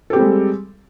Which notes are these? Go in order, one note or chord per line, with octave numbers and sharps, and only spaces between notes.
G3 G#3 C4 G4 A4